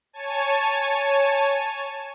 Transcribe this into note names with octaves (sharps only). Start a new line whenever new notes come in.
C#5 G#5 A5